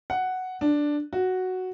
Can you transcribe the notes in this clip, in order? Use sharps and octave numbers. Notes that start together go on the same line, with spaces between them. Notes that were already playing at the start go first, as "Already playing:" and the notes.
F#5
D4
F#4